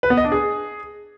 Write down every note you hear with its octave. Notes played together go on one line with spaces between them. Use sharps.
B4
B3
D#5
D4
G#4